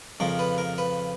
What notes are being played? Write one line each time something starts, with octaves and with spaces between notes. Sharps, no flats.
F2 C#3 F3 A#4
B4
A#4
B4